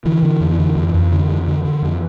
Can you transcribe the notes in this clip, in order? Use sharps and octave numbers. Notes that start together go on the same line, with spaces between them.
D3 E3
D3
F2
D3
F2
F2
D3
F2
D3
D3
F2